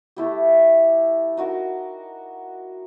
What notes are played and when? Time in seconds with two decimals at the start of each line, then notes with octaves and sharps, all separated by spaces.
0.16 A3 E4 G4
1.37 D#4 F#4 A#4